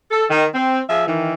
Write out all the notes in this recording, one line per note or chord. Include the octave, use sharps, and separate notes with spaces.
A4
D#3
C4
F3 G#4 E5
D#3 E3